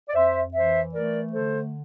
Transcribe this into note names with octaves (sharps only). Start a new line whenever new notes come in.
D5
F2 C5 E5
E3 C5 E5
A3 A#4 D5
D3 A4 C5